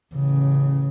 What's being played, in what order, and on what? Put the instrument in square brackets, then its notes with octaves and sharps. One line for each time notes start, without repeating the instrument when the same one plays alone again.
[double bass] A1 C#3